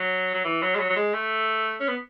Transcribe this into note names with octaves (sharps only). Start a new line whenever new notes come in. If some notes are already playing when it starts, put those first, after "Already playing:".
Already playing: F#3
F#3
E3
F#3
G#3
F#3
F#3
G#3
A3
C#4
B3